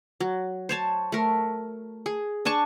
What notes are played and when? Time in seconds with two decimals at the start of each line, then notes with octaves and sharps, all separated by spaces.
0.20 F#3
0.69 C5 C#5 A5
1.12 A3 A#4
2.06 G#4
2.45 D4 G#5 A5 C#6